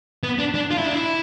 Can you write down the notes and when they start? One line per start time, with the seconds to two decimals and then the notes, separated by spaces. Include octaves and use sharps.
0.23 B3
0.39 D4
0.55 D4
0.71 F4
0.78 E4
0.86 D4
0.93 E4